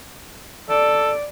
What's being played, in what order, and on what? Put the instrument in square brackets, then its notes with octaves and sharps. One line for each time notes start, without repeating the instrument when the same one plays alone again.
[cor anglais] A4 [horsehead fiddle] D5